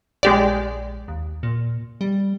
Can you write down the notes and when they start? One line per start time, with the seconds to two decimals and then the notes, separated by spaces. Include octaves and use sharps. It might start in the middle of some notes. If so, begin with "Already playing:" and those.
0.23 A#1 G#3 G4 D5
1.08 D#2
1.43 A#2
2.01 G3